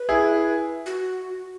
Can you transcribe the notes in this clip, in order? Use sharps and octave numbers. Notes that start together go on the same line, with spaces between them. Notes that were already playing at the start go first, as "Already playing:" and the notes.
Already playing: B4
E4 G#4
F#4